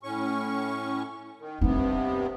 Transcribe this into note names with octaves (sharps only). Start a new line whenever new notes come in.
A2 C#4 C#6
D#3
G2 C3 B3 C4 D#4